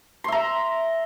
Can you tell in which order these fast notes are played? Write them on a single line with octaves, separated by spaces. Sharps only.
C6 E5 A#5